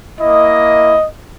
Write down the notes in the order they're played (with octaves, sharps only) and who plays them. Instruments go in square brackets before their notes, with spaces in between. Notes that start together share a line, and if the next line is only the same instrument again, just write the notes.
[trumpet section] A#3 E4 D#5